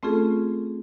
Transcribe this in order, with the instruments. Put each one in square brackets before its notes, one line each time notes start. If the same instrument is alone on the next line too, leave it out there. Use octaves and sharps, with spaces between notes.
[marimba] A3 C4 C#4 F4 G#4 A4